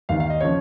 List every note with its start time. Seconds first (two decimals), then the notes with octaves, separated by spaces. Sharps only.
0.09 D#2 D#3 F5
0.20 F5
0.30 D#5
0.40 C#3 F3 C#5